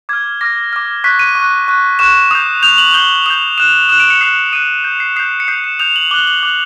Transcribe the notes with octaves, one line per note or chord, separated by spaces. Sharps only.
D6 F6 G#6
D6 F6 A#6
D6 F6
C#6 F#6 B6
D#7
C#6 F#6
C#6 F#6
C#6 F#6 E7
D#6 G6
D#6 G6 F7
F#7
D#6 G6 G7
D#6 G6 F7
D#6 F#6 E7
D#6 F#6 E7
D7
C#7
D#6 F#6 C7
D#6 F#6 D#7
D#6 G6
C7
D#6 G6 C7
C#7
D#6 G6 C7
E7
D#6 G6 F7
F#7
D6 F#6 G7
F#7
D6 F#6